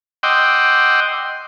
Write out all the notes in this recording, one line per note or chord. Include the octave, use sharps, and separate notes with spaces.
D#5 F#5 G5 C6 D6 E6